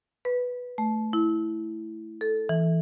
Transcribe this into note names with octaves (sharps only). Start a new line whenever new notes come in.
B4
A3
E4
A4
E3